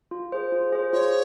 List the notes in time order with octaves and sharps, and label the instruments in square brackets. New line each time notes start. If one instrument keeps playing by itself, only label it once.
[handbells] F4
G#4 C5
F4
G#4 C5
[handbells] F4 [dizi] C#5